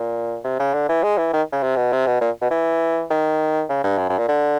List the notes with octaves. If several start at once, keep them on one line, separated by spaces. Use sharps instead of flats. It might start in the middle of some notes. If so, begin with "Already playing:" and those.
Already playing: A#2
C3
C#3
D3
E3
G#3
E3
D#3
C#3
C3
B2
C3
B2
A#2
B2
E3
D#3
C#3
G2
F#2
F#2
A#2
D3